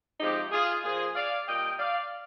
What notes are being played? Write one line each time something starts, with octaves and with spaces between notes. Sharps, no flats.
C3 F3 G#3 D#4 G4
F4 G#4
A#2 F3 A#3 F4 G#4
D5 F5
A#2 G3 A#3 D#5 G5
D5 F5